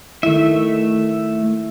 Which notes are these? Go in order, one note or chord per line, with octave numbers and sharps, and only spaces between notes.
D#3 A3 E4 E5